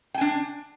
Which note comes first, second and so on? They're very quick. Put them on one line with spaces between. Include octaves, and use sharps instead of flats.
G5 G#5 D4